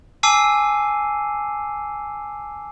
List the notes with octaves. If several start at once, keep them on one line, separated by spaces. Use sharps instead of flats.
G#5 A5 D6 E6 C7 D#7